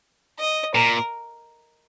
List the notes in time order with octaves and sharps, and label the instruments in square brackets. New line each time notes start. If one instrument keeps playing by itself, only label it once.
[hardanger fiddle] D#5
[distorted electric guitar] A#2 [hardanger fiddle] A#4